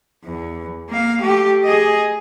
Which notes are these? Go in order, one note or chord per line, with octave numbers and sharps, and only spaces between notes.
E2
A#3 F5
A3 G4
G#4 D#5